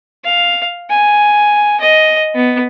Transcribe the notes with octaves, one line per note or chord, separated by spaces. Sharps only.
F5
G#5
D#5
B3